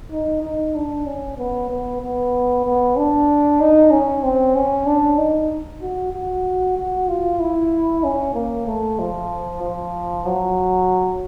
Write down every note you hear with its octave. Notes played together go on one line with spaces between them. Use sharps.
D#4
D#4
D4
C#4
B3
B3
B3
B3
D4
D#4
C#4
C4
C#4
D4
D#4
F#4
F#4
F#4
F4
E4
C#4
A#3
A3
F3
F3
F#3